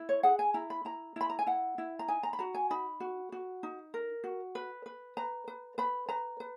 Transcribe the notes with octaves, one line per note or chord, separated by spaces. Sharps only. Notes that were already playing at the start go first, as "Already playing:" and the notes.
Already playing: E4
C#5
G#4 F#5
G#5
E4 A#5
B5
E4 A#5
E4 B5
A#5
G#5
E4 F#5
E4
A#5
D#4 G#5
A#5
B5
F#4 A#5
G#5
D#4 B5
F#4
F#4
D#4
A#4
F#4
B4
B4
B4 A#5
B4
B4 B5
B4 A#5
B4